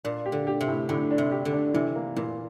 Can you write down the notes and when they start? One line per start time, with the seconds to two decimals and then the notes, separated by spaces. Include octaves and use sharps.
0.05 A#2 D4
0.26 G4
0.32 D3
0.47 G4
0.61 C3
0.68 A2
0.89 A2 D3
1.11 D4
1.18 C3
1.32 G4
1.45 D3
1.53 D4
1.74 C3 E3
1.95 A#3
2.16 A#2 E3